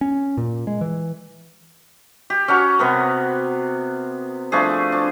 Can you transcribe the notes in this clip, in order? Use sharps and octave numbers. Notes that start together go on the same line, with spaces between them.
C#4
A#2
G#3
E3
G4
C#4 F#4 F#5 A#5
C3 B3 A#4
F3 A3 D4 G#4
D4